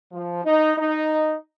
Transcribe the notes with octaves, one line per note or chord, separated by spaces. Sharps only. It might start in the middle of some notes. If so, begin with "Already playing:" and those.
F3
D#4
D#4